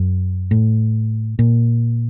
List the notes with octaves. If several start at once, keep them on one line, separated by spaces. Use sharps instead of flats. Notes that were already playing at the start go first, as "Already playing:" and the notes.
Already playing: F#2
A2
A#2